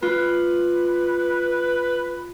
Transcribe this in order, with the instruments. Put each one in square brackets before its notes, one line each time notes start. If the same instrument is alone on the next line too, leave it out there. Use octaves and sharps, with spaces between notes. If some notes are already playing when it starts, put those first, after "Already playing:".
[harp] F4 [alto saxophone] B4